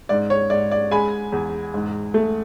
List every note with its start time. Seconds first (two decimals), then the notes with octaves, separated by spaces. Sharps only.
0.09 G#2 D5
0.30 C#5
0.50 G#2 D5
0.71 D5
0.91 G#3 G#5 B5
1.32 E2
1.74 G#2
2.14 A3